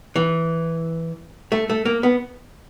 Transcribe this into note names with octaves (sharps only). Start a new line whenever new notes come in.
E3
A3
A3
A#3
B3